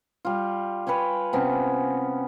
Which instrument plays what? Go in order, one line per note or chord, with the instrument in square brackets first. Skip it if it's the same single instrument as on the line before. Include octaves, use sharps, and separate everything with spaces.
[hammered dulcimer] G3 F4
B4 C#5 G5 G#5
C3 B3 C#4